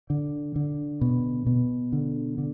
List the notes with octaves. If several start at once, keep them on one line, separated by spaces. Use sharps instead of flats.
D3
D3
B2
B2
D3
D3